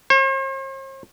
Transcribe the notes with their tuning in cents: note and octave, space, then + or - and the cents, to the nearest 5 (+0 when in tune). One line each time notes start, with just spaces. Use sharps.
C5 +45